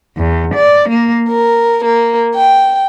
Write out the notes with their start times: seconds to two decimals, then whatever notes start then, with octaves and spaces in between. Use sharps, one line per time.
0.17 E2
0.54 D5
0.90 A#3
1.27 A#4
1.84 A#3
2.35 G5